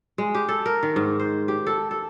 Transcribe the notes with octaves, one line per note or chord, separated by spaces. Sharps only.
G#3
G4
A4
A#4
D#3
G#2
C5
G4
A4
A4